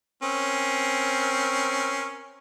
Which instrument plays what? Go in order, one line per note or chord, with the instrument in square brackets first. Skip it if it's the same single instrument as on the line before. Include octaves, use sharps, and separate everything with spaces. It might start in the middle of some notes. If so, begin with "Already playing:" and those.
[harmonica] C4 C#4 A#4